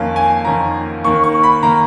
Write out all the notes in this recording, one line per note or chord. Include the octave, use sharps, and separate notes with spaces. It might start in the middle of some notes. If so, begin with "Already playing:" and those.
Already playing: F2 D#3 A#3 C#4 F5
G#5
F2 D#3 A#3 C#4 A#5
D#2 D#3 A#3 C#6
C#6
B5
D#3 A#3 A#5